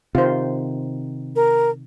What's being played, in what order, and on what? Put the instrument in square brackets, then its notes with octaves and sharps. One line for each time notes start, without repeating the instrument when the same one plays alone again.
[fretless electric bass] C3 D#3 [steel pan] F4 C5
[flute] A#4